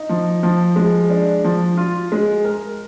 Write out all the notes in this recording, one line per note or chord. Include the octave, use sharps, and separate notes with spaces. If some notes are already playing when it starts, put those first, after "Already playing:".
Already playing: D#4
F3
F3
G#3
D4
F3
F4
G#3
A#4